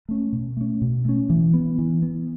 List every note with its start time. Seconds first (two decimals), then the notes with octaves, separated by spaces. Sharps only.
0.09 A3 C#4
0.33 B2
0.57 A3 C#4
0.82 B2
1.05 A3 C#4
1.30 E3
1.54 B3
1.78 E3
2.02 B3